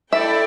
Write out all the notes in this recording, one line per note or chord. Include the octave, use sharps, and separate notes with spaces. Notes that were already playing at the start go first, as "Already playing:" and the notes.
E4 A4 D5 E5 G5